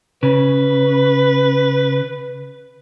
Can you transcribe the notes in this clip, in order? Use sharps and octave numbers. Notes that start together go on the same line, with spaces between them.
C#3 B4